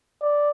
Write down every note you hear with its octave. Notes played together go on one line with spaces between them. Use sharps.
D5